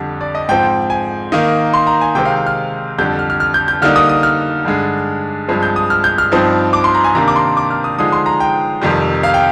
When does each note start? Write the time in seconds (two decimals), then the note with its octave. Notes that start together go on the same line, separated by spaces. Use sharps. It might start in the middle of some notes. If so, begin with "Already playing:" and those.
Already playing: F2 D3 G3 D4
0.21 D5
0.35 D#5
0.49 G#2 F3 C4 G5
0.90 G#5
1.32 D#3 A#3 D#4
1.74 C6
1.87 A#5
2.01 G#5
2.15 C3 D#3 G#3 C4 G5
2.25 F5
2.36 G5
2.46 F6
2.98 F2 D3 G3 D4 G6
3.19 F6
3.30 F6
3.40 F6
3.54 G6
3.68 G6
3.82 D3 G3 A#3 D#4 F6
3.96 D#6
4.09 D#6
4.23 F6
4.65 G2 D3 G#3 D4
5.48 G2 F3 G#3 C4
5.63 G6
5.76 D#6
5.90 F6
6.04 G6
6.18 F6
6.32 G2 F3 C4 D#4
6.73 D6
6.84 C6
6.94 A#5
7.04 G#5
7.15 C3 D#3 A#3 D4 A#5
7.28 D6
7.36 C6
7.57 D6
7.70 F6
7.84 D#6
7.98 D3 F3 G#3 D#4 D#6
8.12 C6
8.26 A#5
8.40 G5
8.81 F2 C3 D#3 G3
9.23 F5
9.34 G5